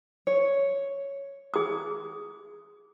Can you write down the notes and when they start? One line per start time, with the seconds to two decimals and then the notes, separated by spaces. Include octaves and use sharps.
0.27 C#5
1.54 G#4 D#6